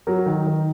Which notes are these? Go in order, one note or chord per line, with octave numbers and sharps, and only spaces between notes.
F#3 A#4
D#3
D#3